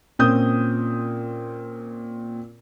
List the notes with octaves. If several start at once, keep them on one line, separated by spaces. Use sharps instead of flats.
A#2 C4 C#4 D#6 G6